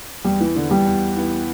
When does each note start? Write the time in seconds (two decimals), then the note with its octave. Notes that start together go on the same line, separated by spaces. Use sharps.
0.24 E2 G3
0.41 E3
0.55 D3 E3 B3 E4
0.71 G3
0.86 E2
1.16 E3 B3 E4